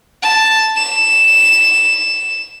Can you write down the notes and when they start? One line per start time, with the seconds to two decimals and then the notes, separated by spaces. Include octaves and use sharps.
0.23 A5
0.77 E7